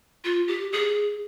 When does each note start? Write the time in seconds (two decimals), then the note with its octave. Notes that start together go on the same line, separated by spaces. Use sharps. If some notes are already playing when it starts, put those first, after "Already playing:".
0.24 F4
0.48 G4
0.72 G#4